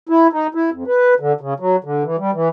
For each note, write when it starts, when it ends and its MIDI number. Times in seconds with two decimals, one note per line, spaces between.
0.09 0.27 64
0.33 0.47 63
0.54 0.70 64
0.72 0.84 41
0.87 1.14 71
1.20 1.33 50
1.41 1.54 49
1.60 1.76 54
1.84 2.03 50
2.04 2.16 52
2.19 2.31 55
2.34 2.49 52